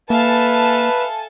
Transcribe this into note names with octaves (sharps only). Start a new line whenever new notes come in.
A#3 A4 B4 E5 F5 G#5 A5